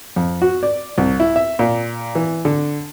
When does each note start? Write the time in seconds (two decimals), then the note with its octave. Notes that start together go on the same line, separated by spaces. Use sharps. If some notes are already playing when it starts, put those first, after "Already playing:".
0.16 F2
0.42 F#4
0.63 D5
0.98 C2
1.20 E4
1.36 E5
1.59 A#2
2.15 E3
2.45 D3